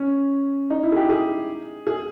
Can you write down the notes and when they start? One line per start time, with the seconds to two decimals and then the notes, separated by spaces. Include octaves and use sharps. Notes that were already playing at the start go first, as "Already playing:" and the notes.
Already playing: C#4
0.70 D#4
0.83 E4
0.92 G#4
0.96 G4
1.09 G#4
1.87 G#4